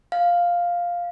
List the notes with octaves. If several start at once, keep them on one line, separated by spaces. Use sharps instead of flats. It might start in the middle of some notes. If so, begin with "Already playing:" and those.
F5